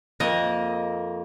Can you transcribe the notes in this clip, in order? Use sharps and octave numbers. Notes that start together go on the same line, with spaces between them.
F2 A#3 D#5